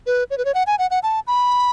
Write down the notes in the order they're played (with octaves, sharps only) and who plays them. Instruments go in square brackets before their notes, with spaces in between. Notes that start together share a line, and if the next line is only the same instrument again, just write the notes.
[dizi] B4
C#5
B4
C#5
F#5
G#5
F#5
F#5
A5
B5